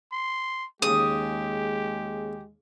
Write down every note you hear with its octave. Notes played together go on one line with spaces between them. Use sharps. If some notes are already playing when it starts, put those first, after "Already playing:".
C6
D#2 C#3 G#3 G4 D#6